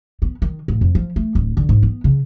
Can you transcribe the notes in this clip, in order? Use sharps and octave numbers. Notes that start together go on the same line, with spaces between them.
B3
D#3
A1
F2
F3
A3
D1
D3
G#2
B3
C#3